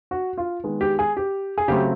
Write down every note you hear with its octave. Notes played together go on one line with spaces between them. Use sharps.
F#4
F4
D#3 G#3 B3
G4
G#4
G4
G#4
C#3 F#3 A3 C4 G4